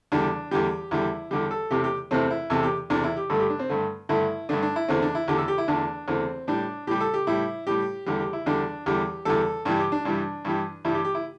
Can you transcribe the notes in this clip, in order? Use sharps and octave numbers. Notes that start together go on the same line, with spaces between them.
E2 D3 G3 D4
E2 D3 G3 G4
E2 D3 G3 E4
E2 D3 G3 G4
A4
E2 C3 A3 G4
G4
E2 C3 A3 C4
E4
E2 C3 A3 A4
G4
E2 C3 A3 D4
E4
G4
G2 D3 A3 A4
G4
D4
C4
G2 D3 A3
G2 D3 A3 E4
G2 D3 A3 D4
D4
E4
E2 D3 A3 C4
D4
E4
E2 D3 A3 G4
A4
G4
E4
E2 D3 A3 D4
E2 D3 A3 C4
A2 G3 D4
A2 G3 G4
A4
G4
A2 G3 E4
A2 G3 G4
E2 D3 G3 G4
G4
E4
E2 D3 G3 D4
E2 D3 G3 G4
E2 D3 G3 A4
G2 E3 G3 D4
G4
D4
G2 E3 G3 D4
G2 E3 G3
G2 E3 G3 E4
G4
G4
E4